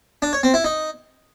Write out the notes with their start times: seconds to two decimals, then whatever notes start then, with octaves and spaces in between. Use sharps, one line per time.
0.22 D4
0.33 C#5
0.43 C4
0.54 E4
0.64 D#4